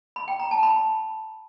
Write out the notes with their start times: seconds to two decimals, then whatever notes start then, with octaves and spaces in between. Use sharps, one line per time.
0.16 B5
0.28 G5
0.39 A#5
0.51 A5
0.63 B5